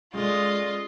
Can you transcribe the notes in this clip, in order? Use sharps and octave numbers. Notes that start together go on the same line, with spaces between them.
G#3 C#4 F4 A4 D5 D#5